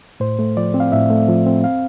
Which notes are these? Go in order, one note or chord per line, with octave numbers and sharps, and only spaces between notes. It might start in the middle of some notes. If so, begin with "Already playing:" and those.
A2 C5
A3
F3 D5
C4
F5
A2 E5
A3
F3
C4
F5